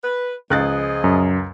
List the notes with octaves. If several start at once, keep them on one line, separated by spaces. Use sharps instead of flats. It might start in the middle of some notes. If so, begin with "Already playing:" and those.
B4
C#2 F3 G#4 D#5 F#6 A6
F#2